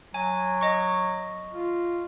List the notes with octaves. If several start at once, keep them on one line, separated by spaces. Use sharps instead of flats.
F#3 G#5
D#5 C#6
F4